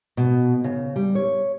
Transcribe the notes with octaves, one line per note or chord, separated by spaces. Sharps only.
B2
C#3
G3
C#5